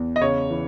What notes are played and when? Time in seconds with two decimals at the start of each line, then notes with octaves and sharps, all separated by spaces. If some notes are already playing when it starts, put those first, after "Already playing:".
Already playing: E2
0.16 D#5
0.21 C#3 C#5
0.50 E3